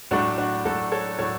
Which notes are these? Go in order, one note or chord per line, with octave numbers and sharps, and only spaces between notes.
A2 F#3 A3 D4 F#4
D4 F#4
A2 F#3 A3 F#4 A4
A4 C#5
A2 F#3 A3 A4 C#5